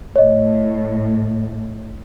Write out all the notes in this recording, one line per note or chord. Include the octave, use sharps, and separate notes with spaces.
A2 C#5 D#5